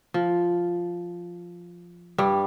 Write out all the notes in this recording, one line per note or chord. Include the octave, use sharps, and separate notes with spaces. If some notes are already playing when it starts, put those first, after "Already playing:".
F3
G2 G3